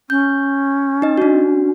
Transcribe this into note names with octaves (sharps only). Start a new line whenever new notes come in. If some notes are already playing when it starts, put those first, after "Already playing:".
C#4 G6
D#4 D#5
D4 F#4